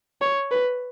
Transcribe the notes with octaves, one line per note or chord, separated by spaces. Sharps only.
C#5
B4